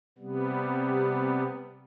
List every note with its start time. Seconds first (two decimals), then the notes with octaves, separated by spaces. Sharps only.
0.18 C3 G3 B3